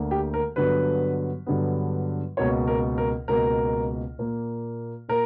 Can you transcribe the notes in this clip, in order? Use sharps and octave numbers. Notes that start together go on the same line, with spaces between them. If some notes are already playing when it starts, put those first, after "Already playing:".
Already playing: D2 D3 A#3
G4
A#4
G2 D3 F#3 B3 B4
G2 D3 F#3 B3
C#2 B2 A#3 C#5
A#4
A#4
C#2 B2 A#3 A#4
A#2 A#3
A#2 A#4